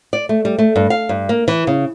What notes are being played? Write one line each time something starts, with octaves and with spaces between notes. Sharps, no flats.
D5
A3
G3
A3
G2
F5
G2
A#3
E3
C#3